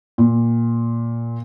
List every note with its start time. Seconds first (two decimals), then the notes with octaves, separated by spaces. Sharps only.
0.18 A#2